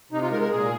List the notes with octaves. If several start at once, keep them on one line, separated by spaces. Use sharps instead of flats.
C3 D#4
F4
G#3 A#4
A#4
A#2 G#4